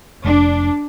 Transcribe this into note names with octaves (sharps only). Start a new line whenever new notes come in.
F1 D4